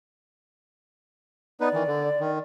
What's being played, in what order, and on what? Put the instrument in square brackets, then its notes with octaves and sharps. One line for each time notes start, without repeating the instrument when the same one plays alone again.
[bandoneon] B3 D#4 B4 [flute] D5
[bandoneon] D#3 E3
D3
D#3